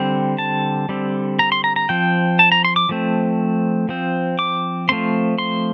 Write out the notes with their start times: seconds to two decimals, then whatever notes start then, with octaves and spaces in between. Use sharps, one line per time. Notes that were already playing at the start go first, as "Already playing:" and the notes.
Already playing: D3 G3 C4
0.38 A5
0.89 D3 G3 C4
1.39 A#5
1.52 C6
1.64 A#5
1.76 A#5
1.89 F3 C4 G5
2.39 A5
2.52 A#5
2.65 C6
2.76 D6
2.89 F3 A3 C4
3.89 F3 C4
4.39 D6
4.89 F3 A3 C4 C6
5.38 C6